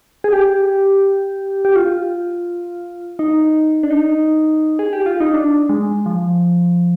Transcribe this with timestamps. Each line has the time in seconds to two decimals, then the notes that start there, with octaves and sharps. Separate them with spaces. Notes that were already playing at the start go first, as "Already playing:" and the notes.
0.24 G#4
0.33 G4
1.65 G4
1.76 F4
3.19 D#4
3.83 D4
3.91 D#4
4.79 G#4
4.93 G4
5.06 F4
5.20 D#4
5.34 D4
5.69 G#3
6.06 F3